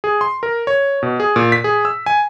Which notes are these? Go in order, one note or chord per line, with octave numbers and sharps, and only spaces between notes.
G#4
C6
A#4
C#5
B2
G#4
A#2
B6
G#4
E6
G#5